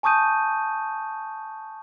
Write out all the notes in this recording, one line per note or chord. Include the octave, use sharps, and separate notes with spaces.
G#5 A5 C#6 D#6 G6 D#7